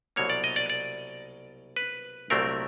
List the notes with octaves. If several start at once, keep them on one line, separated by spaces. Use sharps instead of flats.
C2 B2 F#3 A#3 C#5
D5
D#5
D5
D5
B4
C2 A#2 F#3 A3 C4 A#4